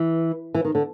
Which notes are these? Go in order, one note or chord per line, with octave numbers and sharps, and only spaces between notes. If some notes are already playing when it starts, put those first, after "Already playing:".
Already playing: E3
E3
D#3
D3